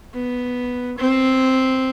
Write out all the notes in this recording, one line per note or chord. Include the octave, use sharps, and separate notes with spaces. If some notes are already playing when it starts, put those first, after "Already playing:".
B3
C4